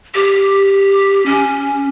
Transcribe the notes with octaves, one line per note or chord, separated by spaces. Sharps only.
G4
C#4